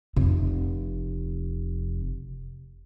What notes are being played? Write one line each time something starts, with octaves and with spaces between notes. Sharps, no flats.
F1 C3